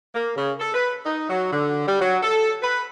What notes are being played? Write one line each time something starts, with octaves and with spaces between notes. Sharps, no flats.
A#3
C#3
A4
B4
D#4
F#3
D3
G3
F#3
A4
B4